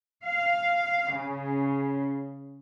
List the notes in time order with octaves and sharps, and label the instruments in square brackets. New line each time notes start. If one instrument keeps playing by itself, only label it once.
[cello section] F5
C#3